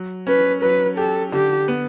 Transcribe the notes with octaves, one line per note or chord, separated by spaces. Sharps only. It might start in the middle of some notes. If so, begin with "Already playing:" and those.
Already playing: F#3
C#4 B4
F#3 B4
G4 A4
D3 G4
B3